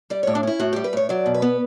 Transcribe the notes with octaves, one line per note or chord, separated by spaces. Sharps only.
G3 D5
A2 C#5
D4
C#4 E4
A2 F#4
G3 G4
B4
A2 C#5
F#3 D5
B2
B4
B3